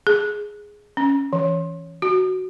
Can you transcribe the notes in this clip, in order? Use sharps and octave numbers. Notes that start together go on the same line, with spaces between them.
G#4
C#4
E3
F#4